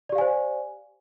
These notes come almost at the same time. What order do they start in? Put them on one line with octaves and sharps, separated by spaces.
D5 G4 F5 G#5 C5